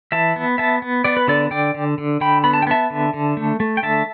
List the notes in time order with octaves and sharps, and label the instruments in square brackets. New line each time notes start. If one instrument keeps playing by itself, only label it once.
[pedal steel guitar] E3 E5 A5
B3
B3 E5 A5
B3
B3 D5
B4
D3 A4 D5
D3 D5 G5
D3
D3
D3 G5 B5
B3 B5
A5
G5
B3 E5 A5
D3
D3
A3
A3
G5
D3 E5 A5